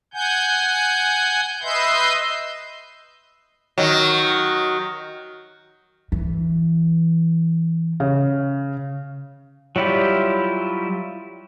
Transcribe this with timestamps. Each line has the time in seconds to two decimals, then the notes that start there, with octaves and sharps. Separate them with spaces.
0.14 F#5 G#5 G6
1.63 B4 D#5 E5 C6 G6
3.78 D#3 F#3
6.12 E3
8.00 C#3
9.76 F#3 G3 E4 F4 G4